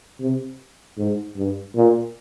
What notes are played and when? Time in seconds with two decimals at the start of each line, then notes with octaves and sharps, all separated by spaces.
0.20 C3
0.97 G#2
1.36 G2
1.75 A#2